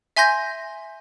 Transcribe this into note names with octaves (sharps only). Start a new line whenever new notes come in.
E5 G#5 C6 G6 A#6